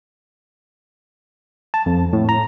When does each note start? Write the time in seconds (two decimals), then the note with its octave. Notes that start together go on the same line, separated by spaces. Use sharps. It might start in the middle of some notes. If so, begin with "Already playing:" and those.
1.74 A5
1.86 F2
2.13 A2
2.29 A#5